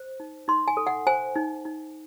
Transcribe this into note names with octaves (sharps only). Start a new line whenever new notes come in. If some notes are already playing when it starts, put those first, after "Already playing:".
Already playing: C5
D#4
D#4 C6
G#5
A4
F#5
C5 G#5
D#4
D#4